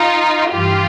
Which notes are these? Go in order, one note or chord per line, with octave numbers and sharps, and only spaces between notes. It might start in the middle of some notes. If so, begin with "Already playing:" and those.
Already playing: D#4 F4
G2 E3 F4 G4